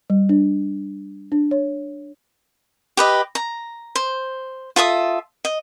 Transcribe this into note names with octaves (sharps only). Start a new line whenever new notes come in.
G3
D4
D4
C#5
G4 B4 D#5
A#5
C5
F4 A4 E5 D#6
D#5